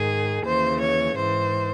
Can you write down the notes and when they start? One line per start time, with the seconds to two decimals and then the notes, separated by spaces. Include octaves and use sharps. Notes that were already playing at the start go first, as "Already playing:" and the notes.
Already playing: G#2 D#3 G#4
0.45 D#2 C#3 E3 C5
0.81 C#5
1.17 G#2 E3 C5